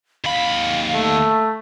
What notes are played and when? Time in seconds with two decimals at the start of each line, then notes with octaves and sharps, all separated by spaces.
0.25 D#2 F5 B5
0.95 A3